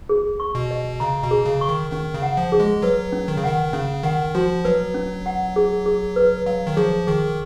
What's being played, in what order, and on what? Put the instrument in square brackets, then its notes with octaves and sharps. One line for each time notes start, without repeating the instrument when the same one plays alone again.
[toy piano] G#4
C#6
[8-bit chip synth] B2
[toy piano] D#5
[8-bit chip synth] C#3 [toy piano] A#5
[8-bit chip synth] B2
[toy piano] G#4
[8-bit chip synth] C#3
[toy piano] C#6
[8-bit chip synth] D#3
[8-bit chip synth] D#3 [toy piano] C#4
[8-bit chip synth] C#3
[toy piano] F#5
[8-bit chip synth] F3
[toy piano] G#4
[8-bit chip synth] G#3
[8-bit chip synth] F#3 [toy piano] B4
[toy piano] C#4
[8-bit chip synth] D#3
C#3
[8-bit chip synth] D#3 [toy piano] F#5
[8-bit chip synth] C#3 [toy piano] C#4
[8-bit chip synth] D#3 [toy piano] F#5
[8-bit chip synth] F3 [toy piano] F#4
[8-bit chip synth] F#3 [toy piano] B4
[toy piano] C#4
F#5
G#4
G#4
B4
[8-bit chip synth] F#3 [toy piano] F5
[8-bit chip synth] D#3
[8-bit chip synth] F3 [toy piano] G#4
[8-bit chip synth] D#3 [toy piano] G#4